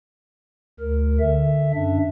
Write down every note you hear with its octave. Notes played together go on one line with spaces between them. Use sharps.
D2 A#4
D3 E5
F#2 D4 E5